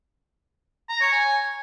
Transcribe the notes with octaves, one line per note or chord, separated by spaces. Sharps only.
A#5
C#5
G#5